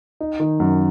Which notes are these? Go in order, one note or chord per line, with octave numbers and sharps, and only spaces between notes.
D#4
D#3
F#2